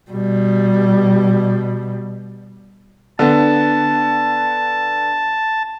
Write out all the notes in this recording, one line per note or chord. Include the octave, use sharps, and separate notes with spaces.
B2 G3
D3 B3 A5